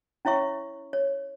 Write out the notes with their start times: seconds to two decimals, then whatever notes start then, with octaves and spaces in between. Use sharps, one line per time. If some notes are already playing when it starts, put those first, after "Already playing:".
0.25 C#4 E4 C#5 E5 C#6
0.93 C#5